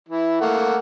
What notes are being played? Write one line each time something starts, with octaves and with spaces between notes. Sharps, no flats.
E3 E4
A3 A#3 F#5